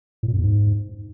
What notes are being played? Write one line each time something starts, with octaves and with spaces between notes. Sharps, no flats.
A2
A#2
F#2
E2
G#2